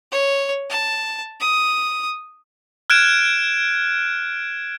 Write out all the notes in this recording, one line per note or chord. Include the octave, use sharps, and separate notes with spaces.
C#5
A5
D#6
F6 F#6 G#6 D7 E7